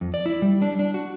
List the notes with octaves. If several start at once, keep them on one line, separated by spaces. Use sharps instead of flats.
F2
D5
E4
G3
D4
D4
F#4